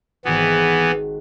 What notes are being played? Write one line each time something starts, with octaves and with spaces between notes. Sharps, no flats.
G#1 E3 B3 F#4